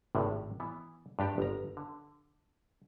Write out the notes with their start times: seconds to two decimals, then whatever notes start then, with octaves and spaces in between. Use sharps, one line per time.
0.15 G#1 A2 C3
0.60 E3 B3
1.19 G2 D4 G4 G5
1.38 G1 A#5
1.77 D3